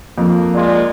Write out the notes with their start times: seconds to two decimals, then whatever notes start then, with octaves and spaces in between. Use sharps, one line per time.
0.18 F2 A#3
0.55 G#3 F4 D5